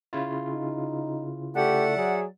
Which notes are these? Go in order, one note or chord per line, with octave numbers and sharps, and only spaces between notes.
C#3 E4 F4
D#4
A3 G4 D5 E5 F#5
F#3 G#4